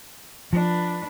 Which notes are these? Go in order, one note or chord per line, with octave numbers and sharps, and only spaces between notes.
F3 D4 B4